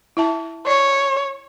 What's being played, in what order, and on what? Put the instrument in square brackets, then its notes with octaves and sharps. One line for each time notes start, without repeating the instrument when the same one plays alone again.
[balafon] E4 E5 A5
[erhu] C#5 [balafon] D5 C#6